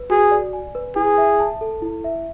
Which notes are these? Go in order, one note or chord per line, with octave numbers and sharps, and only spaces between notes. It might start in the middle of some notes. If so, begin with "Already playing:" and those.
Already playing: B4
F#4 G#4
D5
G#5
B4
E4 G#4
E5
A5
A4
E4
E5